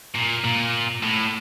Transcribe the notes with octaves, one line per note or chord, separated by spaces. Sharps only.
A#2
A#2
A2